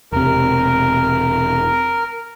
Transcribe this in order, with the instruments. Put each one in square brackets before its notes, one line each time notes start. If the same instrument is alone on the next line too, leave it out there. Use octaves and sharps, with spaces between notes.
[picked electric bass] E1 C3 [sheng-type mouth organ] A#4